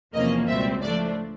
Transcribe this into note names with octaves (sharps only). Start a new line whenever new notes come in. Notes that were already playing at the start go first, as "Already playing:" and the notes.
E2 C3 F3 A#3 C#4 D#5
C#2 B2 G3 C4 E5
A2 F3 A3 D4 D5